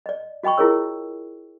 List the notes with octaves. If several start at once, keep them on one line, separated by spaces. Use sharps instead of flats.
D5 D#5
F#4 D#5 G5 B5 C#6
E4 F4 G#4 A#4 C#5 E6